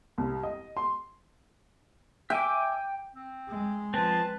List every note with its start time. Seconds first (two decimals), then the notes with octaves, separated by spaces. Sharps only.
0.18 C2
0.43 D#5
0.77 C6
2.30 E5 G5 G#5 D6
3.15 C4
3.49 G#3
3.94 F3 C4 B4 A5